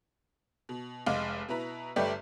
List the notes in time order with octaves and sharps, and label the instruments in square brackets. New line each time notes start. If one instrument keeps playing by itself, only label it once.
[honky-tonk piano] B2
F1 G#3 F5 D6
B2 E4 B4 A#5
G1 G3 A3 B4 D5 G5